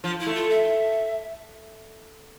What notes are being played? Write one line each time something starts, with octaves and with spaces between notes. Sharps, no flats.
F3 F4
E4
A3
F4
E5